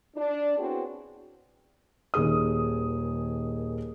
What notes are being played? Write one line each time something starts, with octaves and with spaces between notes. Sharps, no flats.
D4
B3 C4 E4 F#4 G#4 C#5
D#1 D#3 G#4 D#6